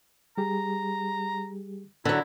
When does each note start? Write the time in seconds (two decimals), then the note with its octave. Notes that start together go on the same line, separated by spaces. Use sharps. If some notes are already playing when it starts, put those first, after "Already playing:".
0.38 G3 G4 G#4 A#5
2.05 D3 F#3 E4